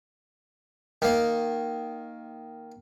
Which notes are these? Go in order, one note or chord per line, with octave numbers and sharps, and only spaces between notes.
D#3 A#3